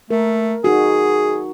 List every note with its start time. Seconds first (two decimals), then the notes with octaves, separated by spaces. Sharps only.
0.10 A3 A#4
0.64 D#4 F#4 G#4